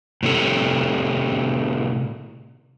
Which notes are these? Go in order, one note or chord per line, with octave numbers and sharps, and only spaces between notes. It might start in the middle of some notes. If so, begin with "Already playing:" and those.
A2 C3 A4